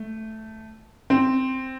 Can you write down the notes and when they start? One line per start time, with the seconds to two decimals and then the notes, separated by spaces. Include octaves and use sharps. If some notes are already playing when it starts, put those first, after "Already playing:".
Already playing: A3
1.10 C4